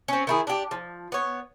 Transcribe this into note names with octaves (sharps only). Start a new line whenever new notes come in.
C4 C#4
D#3 E4 G#4
D4 G4
F3
B3 C#5